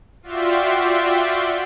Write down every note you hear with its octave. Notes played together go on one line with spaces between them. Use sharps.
F4 F#4 D5 E5 G5 C6